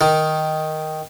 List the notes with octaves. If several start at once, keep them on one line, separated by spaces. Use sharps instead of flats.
D#3